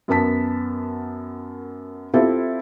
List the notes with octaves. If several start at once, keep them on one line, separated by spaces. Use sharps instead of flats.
F#2 B3 A#4 A5 B6
C4 E4 F4 G4 A4